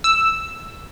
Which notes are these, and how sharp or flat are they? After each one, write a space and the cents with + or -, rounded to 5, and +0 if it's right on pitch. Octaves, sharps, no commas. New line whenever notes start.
E6 +0